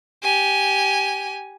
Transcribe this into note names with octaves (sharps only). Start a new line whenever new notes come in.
G4 G#5